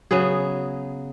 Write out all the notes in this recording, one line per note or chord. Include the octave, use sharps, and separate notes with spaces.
C#3 F#3 B3 G#4